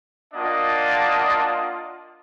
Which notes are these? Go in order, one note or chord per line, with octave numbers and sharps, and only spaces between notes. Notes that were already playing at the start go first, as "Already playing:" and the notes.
A#3 D4 F4 D#5 F#5 A5